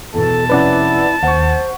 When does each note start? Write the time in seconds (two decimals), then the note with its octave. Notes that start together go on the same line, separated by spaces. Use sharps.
0.14 E2 B2 A4 A5
0.50 F1 C#4 E4 B4 D5 F#5 A6
1.23 D#2 C5 F#5 C#6